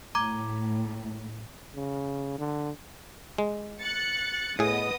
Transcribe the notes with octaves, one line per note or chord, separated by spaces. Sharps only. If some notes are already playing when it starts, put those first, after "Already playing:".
A2 A#5 D6 G#6
C#3
D3
G#3
F#6 A6 C#7
A2 B3 G#4 D#5 D#6